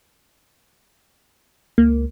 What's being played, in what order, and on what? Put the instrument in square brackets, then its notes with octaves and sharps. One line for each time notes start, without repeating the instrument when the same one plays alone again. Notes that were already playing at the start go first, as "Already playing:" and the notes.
[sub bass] C#2 [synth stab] A#3